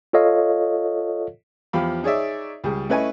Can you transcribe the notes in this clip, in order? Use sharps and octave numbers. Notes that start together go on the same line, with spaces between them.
F4 A4 C#5 D#5 F5
E2 F3 G4 F5 B5
D#4 G#4 C#5 D5 E5
C#2 G3 G#4
A3 C#4 E4 B4 D#5 G#5